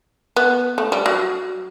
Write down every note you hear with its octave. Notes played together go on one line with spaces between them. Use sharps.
B3
A3
G3
F#3